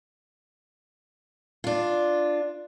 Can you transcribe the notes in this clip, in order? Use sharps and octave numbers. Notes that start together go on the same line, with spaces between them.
D4 F4